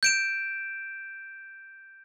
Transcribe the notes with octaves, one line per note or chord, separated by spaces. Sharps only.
G6 D7 E7